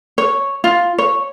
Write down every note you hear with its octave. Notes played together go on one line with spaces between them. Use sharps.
C#5
F4
C#5